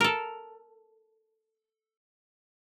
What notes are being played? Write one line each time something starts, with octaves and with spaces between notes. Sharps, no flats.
A4 A#4